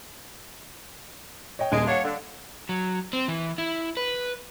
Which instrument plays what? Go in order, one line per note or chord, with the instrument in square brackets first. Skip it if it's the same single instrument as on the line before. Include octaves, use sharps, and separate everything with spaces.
[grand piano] C#5 D#5 G5
[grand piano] D#1 D7 [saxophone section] G#3
[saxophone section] D4 C#5 [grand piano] F5 F#5
[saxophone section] D3
[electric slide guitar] F#3
C4
E3
E4
B4